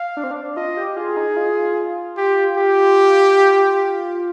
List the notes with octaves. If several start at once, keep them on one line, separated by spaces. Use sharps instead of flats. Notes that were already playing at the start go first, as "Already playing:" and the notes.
Already playing: F5
D4
C4
D4
F4 D#5
G4
F4 G#4
D#4
F4
G4
G4